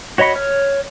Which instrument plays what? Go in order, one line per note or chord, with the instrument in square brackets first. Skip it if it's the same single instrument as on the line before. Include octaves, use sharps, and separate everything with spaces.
[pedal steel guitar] F#4 C#5 D#5 B5 C#6
C#5 F6